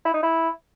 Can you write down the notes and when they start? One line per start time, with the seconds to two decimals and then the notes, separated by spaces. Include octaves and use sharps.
0.05 E4
0.14 D#4
0.23 E4